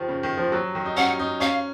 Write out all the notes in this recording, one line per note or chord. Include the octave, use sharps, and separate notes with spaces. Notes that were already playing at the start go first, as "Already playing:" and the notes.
Already playing: D#3 F3
C#3
D#3
F3
F#3
D#3
D#4
C#4 F#5
D#4
C#4 F5